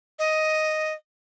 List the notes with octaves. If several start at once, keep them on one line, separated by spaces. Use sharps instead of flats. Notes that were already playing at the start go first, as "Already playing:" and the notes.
D#5